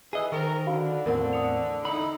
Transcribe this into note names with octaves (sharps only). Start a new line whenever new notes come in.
E3 G#4 D#5
D#3 A#4 C5 C#6
D3 F#4 F5 B5
E2 A2 C4 A#4 F#5
D#6 C#7 F7
D#4 E4 B5